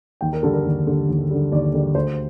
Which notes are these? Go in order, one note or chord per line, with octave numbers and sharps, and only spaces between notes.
D#2 G5
A#4
D3 G3 A4
A#4
D#2
D3 G3
D#2
D3 G3
D#2 D5
D3 G3 D5
D2 C5